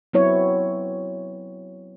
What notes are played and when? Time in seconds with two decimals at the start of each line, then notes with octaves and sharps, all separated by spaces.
0.13 F#3 B3 C4 E4 C#5